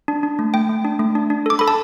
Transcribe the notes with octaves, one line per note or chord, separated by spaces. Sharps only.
D4
D4
A3
A3 G5
A3
D4
A3
D4
D4
A4 D6
A4 B5
A5